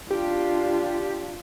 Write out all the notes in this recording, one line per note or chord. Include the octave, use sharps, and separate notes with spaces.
D4 F4 G4